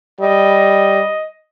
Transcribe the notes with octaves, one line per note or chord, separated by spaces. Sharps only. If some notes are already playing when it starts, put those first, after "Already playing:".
G3 D#5